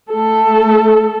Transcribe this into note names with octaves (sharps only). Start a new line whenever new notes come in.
A3 A4